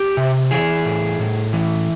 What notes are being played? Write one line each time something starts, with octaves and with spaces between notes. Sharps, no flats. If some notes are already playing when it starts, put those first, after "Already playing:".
Already playing: G4
C3
E3 G#4
A2
A2
E3